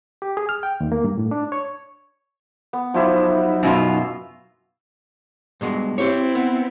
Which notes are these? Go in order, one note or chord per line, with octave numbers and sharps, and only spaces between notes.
G4
G#4
F6
G5
D#2
A#3
G2
A2
D4
C#5
B3
F3 F#3 D#4 E4 D6
F#2 B2 F4 E5
G2 B2 G#3
C4 E4 G4 C5 C#5
B3